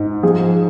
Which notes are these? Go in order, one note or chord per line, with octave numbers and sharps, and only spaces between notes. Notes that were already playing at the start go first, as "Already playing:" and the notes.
Already playing: G#2
F3 G#4